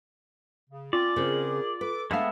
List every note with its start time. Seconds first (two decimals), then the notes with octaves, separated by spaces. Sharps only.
0.70 C#3
0.93 C4 C#4 F4 D5
1.16 C#3 C4 G#4 A#4
1.81 A4 B4 D6
2.11 G#3 A3 B3 D4 A4 E5 F5